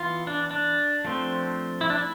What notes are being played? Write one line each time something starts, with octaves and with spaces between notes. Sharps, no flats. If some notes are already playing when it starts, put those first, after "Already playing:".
Already playing: E3 B3 F4
D4
D4
F3 A3 C4
E4
D4
E4